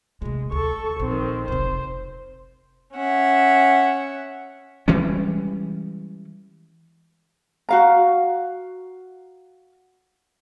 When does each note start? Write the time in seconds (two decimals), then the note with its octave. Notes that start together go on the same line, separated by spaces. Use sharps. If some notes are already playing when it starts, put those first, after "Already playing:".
0.22 C3 G#3 A3
0.52 D2 A4 C#6
0.99 A#1 D#3 C4
1.48 F1 C3 C5
2.95 C#4 E5 F#5
4.88 E3 G3 G#3 C#4
7.69 F#4 F5 A#5